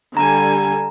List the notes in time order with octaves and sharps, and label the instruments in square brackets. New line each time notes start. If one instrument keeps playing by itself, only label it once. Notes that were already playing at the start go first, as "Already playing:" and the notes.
[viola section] D3 G3 G#5 [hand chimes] A#5